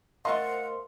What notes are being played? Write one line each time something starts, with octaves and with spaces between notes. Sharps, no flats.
A3 F4 A#4 C5 D#5 F5 F#5 C6